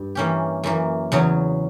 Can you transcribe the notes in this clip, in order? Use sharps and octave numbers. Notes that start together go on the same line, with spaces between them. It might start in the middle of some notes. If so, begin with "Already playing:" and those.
Already playing: G2
E3 A#3 C#4 G4
F#2 E3 A#3
E2 C#3 F#3